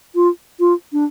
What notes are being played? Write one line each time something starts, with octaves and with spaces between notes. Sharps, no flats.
F4
F4
D4